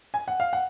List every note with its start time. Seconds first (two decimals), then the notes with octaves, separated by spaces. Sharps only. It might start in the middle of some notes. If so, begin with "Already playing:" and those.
0.14 G#5
0.28 F#5
0.40 F5
0.53 F#5